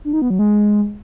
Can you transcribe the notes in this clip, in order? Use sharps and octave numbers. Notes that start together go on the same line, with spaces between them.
D4
D#4
B3
F#3
G#3